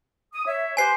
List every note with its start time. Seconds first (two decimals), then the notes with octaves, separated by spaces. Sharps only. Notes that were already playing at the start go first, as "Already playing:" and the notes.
0.34 D#6
0.46 C#5 E5
0.77 G4 B4 C5 G#5 C7